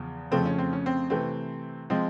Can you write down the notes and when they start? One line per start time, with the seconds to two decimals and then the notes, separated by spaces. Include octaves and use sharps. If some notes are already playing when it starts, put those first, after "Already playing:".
Already playing: E2 C#3 F3
0.31 F2 C#3 F3 A3 C4
0.45 C#4
0.58 C4
0.73 C#4
0.86 C4
1.10 C3 E3 A3 C4
1.90 F3 G#3 C4